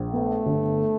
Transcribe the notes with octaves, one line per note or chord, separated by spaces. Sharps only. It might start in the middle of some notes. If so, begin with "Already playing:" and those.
Already playing: A#1
A3 B3
G1